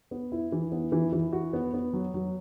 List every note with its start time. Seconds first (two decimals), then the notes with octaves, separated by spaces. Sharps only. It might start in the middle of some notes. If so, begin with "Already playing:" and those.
0.11 B3
0.32 E4
0.52 E3
0.72 B3
0.92 E3
1.13 E3
1.32 F#4
1.53 B3
1.74 B3
1.93 F#3
2.14 F#3